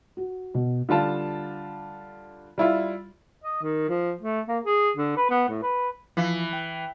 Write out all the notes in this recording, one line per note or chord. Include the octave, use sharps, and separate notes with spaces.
F#4
B2
D3 G3 F4 A5
G3 E4 F4
D#5
D#3
F3
A3
A#3
G#4
D3
B4
B3
A2
B4
E3 F3
G5